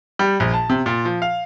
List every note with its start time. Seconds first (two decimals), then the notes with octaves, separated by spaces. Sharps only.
0.19 G3
0.40 A#1
0.53 A5
0.70 C3
0.86 A#2
1.05 F3
1.22 F5